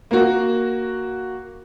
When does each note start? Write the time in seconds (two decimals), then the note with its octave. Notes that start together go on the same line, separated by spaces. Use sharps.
0.11 A#3 F#4